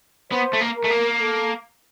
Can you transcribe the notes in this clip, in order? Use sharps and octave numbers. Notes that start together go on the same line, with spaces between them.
B3 C5
A3
A#3
A#4
A3
A#3
A4